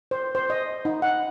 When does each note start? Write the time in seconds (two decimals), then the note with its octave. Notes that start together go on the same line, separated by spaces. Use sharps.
0.11 C5
0.35 C5
0.50 D#5
0.85 D#4
1.02 F#5